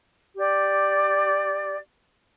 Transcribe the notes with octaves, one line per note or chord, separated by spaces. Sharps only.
G4 D5